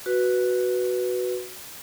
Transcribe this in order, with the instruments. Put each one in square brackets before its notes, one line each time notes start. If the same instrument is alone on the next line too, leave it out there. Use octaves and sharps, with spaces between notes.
[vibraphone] F#4 B4